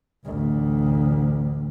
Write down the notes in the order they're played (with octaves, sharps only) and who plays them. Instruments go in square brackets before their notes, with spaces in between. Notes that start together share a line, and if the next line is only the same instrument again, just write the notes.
[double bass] A1 D2